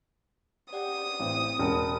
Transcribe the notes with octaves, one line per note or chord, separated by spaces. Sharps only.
G4 D5 F#5 G5 D#6
A1 C4 C5
E1 C#4 G4 A#4 A5